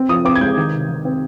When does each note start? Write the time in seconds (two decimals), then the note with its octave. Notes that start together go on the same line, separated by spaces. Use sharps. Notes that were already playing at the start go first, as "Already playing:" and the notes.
Already playing: C4
0.09 F3 D#6
0.25 C4 D6
0.35 G#6
0.41 G#3 G6
0.57 D#3
0.73 C3
0.89 D#3
1.05 C4